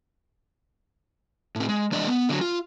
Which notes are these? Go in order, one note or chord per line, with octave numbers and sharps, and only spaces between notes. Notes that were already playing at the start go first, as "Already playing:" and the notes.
A2 C4
G#3
E3 G#3 D4 D5 D#5
B3
D3 F#3
F4